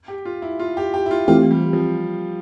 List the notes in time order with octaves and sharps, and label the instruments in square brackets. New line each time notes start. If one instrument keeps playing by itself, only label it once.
[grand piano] G4
F4
E4
F4
G4
G4
E4
F4
[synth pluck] E3 A3 C4 G4 [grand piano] F4
[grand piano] G3
F3